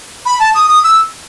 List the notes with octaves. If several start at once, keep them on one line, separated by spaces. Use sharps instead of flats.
B5
A5
D#6
D#6
E6